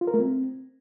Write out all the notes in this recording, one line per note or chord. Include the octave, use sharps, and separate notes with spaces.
F4
A#4
A3
C4